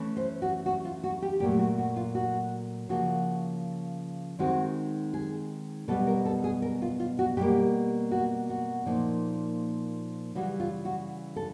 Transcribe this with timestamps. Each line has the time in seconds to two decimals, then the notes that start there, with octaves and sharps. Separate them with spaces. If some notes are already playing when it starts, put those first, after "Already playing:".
Already playing: E3 A3 C#4
0.17 C5
0.42 F#4
0.66 F#4
0.85 F4
1.04 F#4
1.22 G4
1.40 A#2 F#3 A3 G4
1.59 F#4
1.78 F#4
1.96 F4
2.15 F#4
2.89 C#3 F3 A#3 F#4
4.39 D#3 G#3 C4 D#4 F#4
5.14 G#4
5.88 B2 G3 B3 A4
6.07 A#4
6.25 A4
6.44 G#4
6.62 A#4
6.82 F4
7.00 F4
7.19 F#4
7.37 B2 G3 A#3 G4
8.11 F#4
8.50 F#4
8.86 A#2 F3 A#3 D#4
10.35 C#3 E3 G3 F#4
10.60 F4
10.85 F#4
11.36 A4